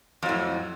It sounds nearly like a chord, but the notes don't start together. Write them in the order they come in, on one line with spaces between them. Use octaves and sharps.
F2 F#3 A2